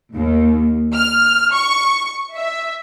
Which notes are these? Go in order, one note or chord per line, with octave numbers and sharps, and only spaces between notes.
D#2
F6
C#6
E5